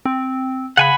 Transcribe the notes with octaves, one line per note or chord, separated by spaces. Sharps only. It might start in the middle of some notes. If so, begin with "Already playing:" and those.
C4
C#3 F#5 G#5 B5